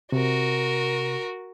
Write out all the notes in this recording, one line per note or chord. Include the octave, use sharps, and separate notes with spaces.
C3 F#4 A#4